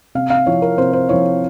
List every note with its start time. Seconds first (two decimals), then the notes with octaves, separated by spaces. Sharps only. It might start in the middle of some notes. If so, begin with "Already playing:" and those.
0.15 C3 F5
0.30 F5
0.46 F3 C4 E4 C#5
0.62 A#4
0.78 C3 C5
0.93 C5
1.09 F3 C4 E4 C#5